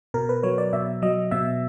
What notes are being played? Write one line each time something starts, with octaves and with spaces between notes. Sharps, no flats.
B2 A#4
B4
F#3 C#5
D5
B2 E5
F#3 D#5
B2 E5